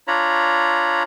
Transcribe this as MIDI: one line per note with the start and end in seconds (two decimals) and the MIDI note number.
0.08 1.03 62
0.08 1.03 65
0.08 1.03 73
0.08 1.03 82
0.08 1.03 83